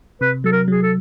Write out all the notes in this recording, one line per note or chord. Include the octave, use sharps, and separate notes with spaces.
C3 B4
F#3 A4
A#4
F#3 G#4
A4